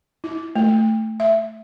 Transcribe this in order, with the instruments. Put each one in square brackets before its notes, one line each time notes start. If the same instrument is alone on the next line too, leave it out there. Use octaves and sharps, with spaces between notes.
[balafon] E4
A3
E5